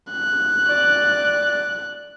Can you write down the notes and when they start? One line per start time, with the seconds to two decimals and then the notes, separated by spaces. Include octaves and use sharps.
0.12 F#6
0.67 D5